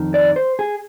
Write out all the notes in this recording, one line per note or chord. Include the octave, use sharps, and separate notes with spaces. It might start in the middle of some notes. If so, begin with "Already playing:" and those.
Already playing: F2 D#3
D5
C5
G#4